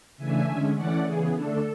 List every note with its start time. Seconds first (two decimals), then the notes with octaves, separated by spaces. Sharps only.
0.17 C#3 E3 A3 D4 E5 G#5
0.46 D3 G#3 C#4
0.76 E3 A3 C#4 D5 F#5
1.05 C#3 E3 B3 G#4
1.34 D3 A3 D4 A4